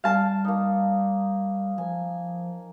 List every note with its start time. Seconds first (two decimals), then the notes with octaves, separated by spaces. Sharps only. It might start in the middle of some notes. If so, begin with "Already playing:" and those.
0.04 G3 F5 A5
0.44 A#3 D#4
1.78 F3 G#5